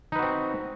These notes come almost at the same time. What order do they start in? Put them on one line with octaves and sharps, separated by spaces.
D#4 B4 F#4 C4